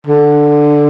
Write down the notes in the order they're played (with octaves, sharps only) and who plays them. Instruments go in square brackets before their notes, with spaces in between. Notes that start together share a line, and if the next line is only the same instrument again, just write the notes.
[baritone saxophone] D3